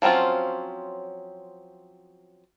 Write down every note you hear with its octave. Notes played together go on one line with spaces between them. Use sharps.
F3 F#3 C4 C#4 F4